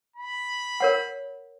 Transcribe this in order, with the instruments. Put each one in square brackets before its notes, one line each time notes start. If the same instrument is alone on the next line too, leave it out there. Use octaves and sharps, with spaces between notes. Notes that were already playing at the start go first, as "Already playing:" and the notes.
[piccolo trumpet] B5
[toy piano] A#4 C#5 F#5